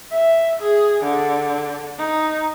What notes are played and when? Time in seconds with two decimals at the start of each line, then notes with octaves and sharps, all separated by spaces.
0.11 E5
0.62 G#4
1.03 D3
1.98 D#4